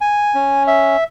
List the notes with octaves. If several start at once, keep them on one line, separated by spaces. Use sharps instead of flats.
G#5
C#4
E5